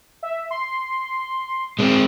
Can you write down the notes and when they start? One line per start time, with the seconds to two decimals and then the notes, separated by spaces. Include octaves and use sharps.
0.23 E5
0.51 C6
1.79 G#3 C4